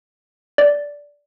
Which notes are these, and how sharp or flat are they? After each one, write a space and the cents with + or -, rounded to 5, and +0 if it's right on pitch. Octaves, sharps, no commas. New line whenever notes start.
D5 -10